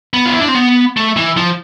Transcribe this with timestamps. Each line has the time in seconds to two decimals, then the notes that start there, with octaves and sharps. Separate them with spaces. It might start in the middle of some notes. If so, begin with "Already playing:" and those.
0.14 B3
0.26 F4
0.33 E4
0.41 D4
0.48 C4
0.55 B3
0.97 A3
1.17 E3
1.37 F3